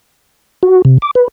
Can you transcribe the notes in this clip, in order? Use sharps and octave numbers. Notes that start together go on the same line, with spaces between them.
F#4
C3
D6
B4